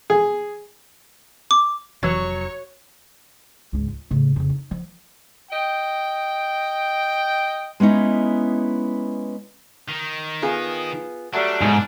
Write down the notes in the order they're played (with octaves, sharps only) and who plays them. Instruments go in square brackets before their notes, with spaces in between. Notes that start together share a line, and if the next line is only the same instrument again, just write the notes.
[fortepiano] G#4
[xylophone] D6
[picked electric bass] F1 [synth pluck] E3 E6 G#6 [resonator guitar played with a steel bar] F#3 [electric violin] C#5 C#6
[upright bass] C#2 G#2
F4
A2 C#3
F2 C#3
D#4
F3
[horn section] D#5 G5
[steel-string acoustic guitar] G#3 B3 C#4 D#4 E4
[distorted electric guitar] D#3
[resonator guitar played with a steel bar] B3 F4 G#4
[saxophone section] F#3 G3 A3 [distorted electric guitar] D4
[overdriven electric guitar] G#2 [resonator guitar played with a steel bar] B2